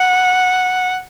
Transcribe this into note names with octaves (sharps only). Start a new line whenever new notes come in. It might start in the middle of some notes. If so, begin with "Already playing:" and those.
Already playing: F#5